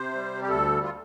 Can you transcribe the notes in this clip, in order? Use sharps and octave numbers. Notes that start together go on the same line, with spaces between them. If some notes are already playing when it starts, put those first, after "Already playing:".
Already playing: C3 C5
G3
G4
D2 A4
F4